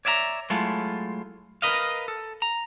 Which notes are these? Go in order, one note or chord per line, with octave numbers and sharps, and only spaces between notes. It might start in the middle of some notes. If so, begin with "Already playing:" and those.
C#5 D5 E5 F5 A#5
F#3 G#3 A3 E4 F4
A#4 B4 D#5 F5
A4
A#5